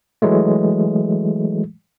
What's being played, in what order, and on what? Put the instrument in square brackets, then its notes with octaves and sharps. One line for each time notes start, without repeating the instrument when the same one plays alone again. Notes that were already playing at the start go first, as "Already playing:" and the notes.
[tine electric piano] E3 F#3 G#3 A3